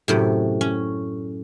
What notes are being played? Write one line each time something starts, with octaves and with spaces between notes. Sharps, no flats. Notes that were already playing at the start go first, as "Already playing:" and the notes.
F#2 A2 C3
C#4